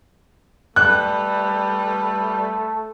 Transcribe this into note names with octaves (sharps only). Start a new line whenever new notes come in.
G3 A3 B4 F#6